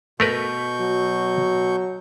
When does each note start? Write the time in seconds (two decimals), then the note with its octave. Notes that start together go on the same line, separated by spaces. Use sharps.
0.20 B2 A3 A#4 B4 C#6 G6
0.81 F#3